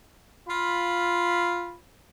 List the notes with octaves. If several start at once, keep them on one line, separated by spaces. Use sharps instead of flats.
F4 B5